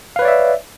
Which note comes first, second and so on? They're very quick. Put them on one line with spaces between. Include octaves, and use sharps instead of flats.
F5 B4 C#5 D5 E5